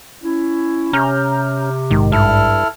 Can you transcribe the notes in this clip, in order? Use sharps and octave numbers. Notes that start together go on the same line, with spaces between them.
C#4 E4
C3 C#4 A#5 F6 G6
A#1 G#2 D#3
G2 E4 A4 F6